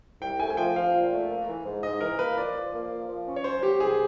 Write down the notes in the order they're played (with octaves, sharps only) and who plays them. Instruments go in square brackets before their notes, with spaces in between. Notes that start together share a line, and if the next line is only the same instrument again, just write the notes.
[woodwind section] C2 [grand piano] G5
[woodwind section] A3 [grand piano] G#5
[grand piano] G#5
[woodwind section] F3 [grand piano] G5
[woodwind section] F3 [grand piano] F5
[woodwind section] A#2
A3
A#3
E3
G#2
[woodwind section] G#2 [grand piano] D#5
[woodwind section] E3 [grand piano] A#4
[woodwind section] A#3 [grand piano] B4
[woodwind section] F3 [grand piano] D5
[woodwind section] F3
A#3
F3
F3
C#4
[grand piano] C#5
[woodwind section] F#3 [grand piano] C5
[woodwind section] B3 [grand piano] G4
[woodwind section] C2 [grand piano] G#4